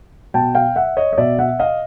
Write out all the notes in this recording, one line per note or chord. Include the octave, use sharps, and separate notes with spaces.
B2 G5 A5
F5 G5
E5 F#5
C#5 D#5
D#5
B2 D5 E5
E5 F#5
D#5 F5